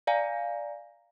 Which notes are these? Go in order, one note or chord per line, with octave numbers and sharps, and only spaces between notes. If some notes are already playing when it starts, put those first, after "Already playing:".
D5 F5 G#5 A#5